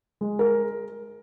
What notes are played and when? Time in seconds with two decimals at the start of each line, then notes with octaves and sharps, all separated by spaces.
0.21 G#3
0.39 A#4